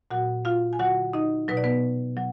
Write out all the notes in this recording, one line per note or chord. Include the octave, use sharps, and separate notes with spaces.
A#2 F#3 F#4 F#5
F4 F5
G#5
D3 F#3 F#4 F#5
D#4 D#5
B2 F#3 B4
D5
B3 B4
F#3